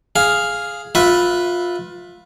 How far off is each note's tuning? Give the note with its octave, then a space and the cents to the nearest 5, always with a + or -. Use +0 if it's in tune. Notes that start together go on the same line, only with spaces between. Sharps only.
G#4 +0 F5 +0
F4 +20 B4 +0 E5 +0